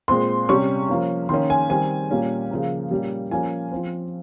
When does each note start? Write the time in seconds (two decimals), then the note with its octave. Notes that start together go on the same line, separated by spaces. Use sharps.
0.08 A#2 G#3 C4 C6
0.49 C3 G3 C#4 C#6
0.89 F3 A#3 C#4
1.29 D#3 A#3 C#4 C6
1.50 G#5
1.69 D#3 G3 C4 G#5
2.11 A#2 G3 A#3 C#4
2.51 C#3 F3 A#3
2.91 A#2 G3 A#3 C#4
3.31 F3 A#3 C#4 G#5
3.72 F3 C4